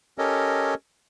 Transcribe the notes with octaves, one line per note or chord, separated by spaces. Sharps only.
C#4 G4 A4 A#4 C#5 D#5